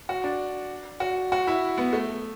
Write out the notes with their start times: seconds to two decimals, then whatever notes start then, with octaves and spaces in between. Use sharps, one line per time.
0.09 F#4
0.24 D4
1.00 F#4
1.32 F#4
1.47 E4
1.78 B3
1.93 A3